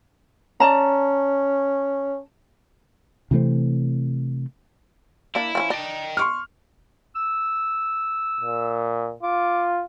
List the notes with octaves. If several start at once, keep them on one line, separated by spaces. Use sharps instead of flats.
C#4 D5 A5 A#5
C3 E3 A3 C4
A#3 D4 E4
F3 C4 C#4
D4 D#5 G5
C6 C#6 F6
E6
A#2
F4 D6